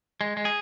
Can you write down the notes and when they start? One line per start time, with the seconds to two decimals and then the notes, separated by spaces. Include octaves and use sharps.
0.21 G#3
0.37 G#3
0.45 G#4